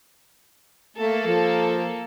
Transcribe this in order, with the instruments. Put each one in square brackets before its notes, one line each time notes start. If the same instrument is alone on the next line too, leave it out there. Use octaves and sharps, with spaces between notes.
[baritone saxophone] A3 [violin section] A#3 A4
[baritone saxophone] F3